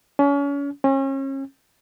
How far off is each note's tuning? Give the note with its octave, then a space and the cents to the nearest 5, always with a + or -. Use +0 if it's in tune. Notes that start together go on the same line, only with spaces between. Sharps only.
C#4 +35
C#4 -35